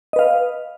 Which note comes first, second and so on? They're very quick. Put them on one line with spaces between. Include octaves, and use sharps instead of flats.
D#5 B4 F5